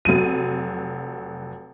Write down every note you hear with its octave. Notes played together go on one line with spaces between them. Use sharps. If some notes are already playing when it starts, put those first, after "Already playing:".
F1 F#3 D#7